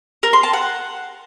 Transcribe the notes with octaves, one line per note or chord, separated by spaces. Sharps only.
A#4
C6
A5
F#5